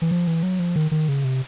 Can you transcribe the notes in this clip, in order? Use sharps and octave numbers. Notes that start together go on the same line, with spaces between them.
E3
F3
E3
F#3
F3
D#3
D#3
C#3
C3